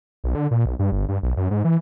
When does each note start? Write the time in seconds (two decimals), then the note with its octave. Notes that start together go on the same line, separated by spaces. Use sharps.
0.24 B1
0.35 D3
0.51 A#2
0.66 B1
0.79 G2
0.92 G1
1.09 G2
1.23 B1
1.37 F#2
1.51 G#2
1.65 E3